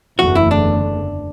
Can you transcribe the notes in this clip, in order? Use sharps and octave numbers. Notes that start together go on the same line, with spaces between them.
F#1 E2 D3 A3 F#4
E4
D4